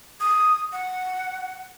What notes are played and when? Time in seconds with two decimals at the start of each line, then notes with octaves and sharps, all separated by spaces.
0.20 D#6
0.72 F#5